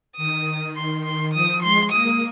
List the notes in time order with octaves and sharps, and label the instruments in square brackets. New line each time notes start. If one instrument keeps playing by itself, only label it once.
[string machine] D#3 [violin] D#6
[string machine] D#3 [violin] C6
[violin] C6
[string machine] F3 [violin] D#6
[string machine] G#3 [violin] C6
[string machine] A#3 [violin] D#6